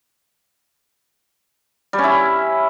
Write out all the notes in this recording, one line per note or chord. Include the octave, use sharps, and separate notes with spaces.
G3
C#4
E4